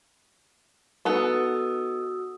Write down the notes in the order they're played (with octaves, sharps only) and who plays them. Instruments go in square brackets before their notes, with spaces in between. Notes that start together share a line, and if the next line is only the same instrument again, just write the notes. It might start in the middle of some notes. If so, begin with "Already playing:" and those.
[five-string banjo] B3 D#4 A4 [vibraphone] F#4 D#6 E6